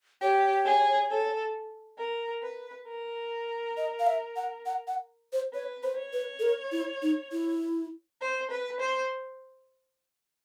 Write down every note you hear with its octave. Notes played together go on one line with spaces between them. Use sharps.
G4 C#5
G#4
A4
A#4
B4
A#4
D#5
F5
E5
F#5
F#5
F#5
C5
B4 C#5
C5
C#5
B4
A4
A#4
E4
D#4
E4
C5
B4
C5